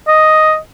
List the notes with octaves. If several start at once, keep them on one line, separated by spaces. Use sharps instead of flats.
D#5